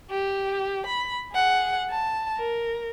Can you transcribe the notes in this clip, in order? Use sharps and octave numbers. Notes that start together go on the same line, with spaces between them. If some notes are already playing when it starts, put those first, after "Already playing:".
G4
B5
G#4 F#5
A5
A#4